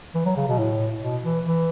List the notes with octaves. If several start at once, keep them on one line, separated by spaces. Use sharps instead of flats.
E3
F#3
C#3
B2
A2
B2
E3
E3